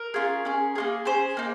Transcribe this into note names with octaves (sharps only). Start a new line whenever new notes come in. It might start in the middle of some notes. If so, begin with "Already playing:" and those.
Already playing: A#4
C#4 F4 G#4
C#4 G#4
A#3 F4 G#4
C#4 G#4 C5
A#3 D#4